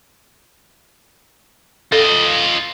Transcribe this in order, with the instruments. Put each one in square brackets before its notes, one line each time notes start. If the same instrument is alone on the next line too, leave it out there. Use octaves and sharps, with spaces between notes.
[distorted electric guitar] F4 D#5 [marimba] A4